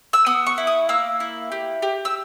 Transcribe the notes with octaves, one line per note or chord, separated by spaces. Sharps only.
E6
B3 D#6
C#6
E4
D#6
A#3 E6
E4
G4
G4
E6